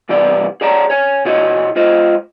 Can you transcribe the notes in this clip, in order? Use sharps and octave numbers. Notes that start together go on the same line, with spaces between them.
C2 E3 G3 B3 D5
G#4 C#5 D5 A5 A#5
C#5 G#5
B2 E4 F#4 C#5 D#5
G#3 F4 C5 D#5